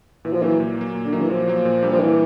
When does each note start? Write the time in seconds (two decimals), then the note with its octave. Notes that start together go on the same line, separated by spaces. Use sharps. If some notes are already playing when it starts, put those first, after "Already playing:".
0.25 A#2 E3
0.33 F3
0.42 E3 F#3 A#3
0.60 A#2
0.78 F#3 A#3
0.95 A#2
1.05 D3
1.13 D#3 F#3 A#3
1.21 E3
1.30 A#2 F3
1.47 F#3 A#3
1.65 A#2
1.83 G3 A#3 D4 G4
1.92 F3
2.00 A#2 E3